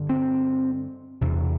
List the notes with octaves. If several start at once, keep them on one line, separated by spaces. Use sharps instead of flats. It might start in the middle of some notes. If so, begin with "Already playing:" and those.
Already playing: G2 D3
C4
E2 C3